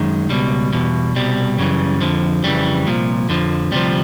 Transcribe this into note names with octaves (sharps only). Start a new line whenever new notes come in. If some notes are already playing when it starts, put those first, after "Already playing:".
Already playing: F#2 D#3 G#3
C#2 B2 G3
E2 B2
C2 B2 G3
F#2 C#3 E3
F2 D3 F3
F2 C#3 E3 G3
C2 A#2 F3
F2 D3 F3
D2 C3 F3 G3